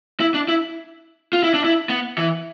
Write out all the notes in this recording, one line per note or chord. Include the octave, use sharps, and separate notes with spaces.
E4
D4
E4
F4
E4
D4
E4
B3
E3